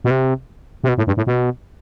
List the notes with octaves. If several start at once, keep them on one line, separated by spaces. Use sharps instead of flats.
B2
C3
C3
B2
A2
G2
A2
B2